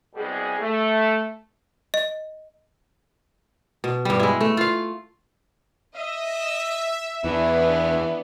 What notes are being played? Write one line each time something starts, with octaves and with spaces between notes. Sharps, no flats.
C2 B2 G3 G#3 G#4
A3
D#5
B2
G2 G3
G#3 E4
A3
F4 F5
D#5 E5
E2 E3 B3 D4